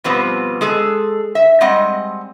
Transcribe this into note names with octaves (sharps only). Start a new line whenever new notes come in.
B2 F3 G3 B3 C4
G#3 G#4 A4
E5
G3 G#3 C4 D#5 F#5